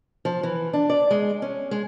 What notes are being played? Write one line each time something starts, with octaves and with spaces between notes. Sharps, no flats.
F3
E3
D4
D5
G#3
C#4
G#3